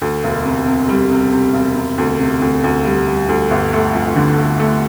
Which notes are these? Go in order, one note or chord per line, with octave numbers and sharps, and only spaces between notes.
D2
E1
C3
C3
G3
C3
C3
E1
C3
D2
C3
D2
D2
G3
G3
D2
G1
A3
F2
D3
A3
A3